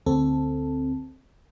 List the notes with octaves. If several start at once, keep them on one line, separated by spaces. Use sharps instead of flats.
D2 C4 A4